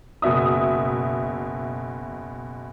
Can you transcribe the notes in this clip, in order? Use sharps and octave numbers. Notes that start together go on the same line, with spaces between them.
F#1 B2 E5 D#6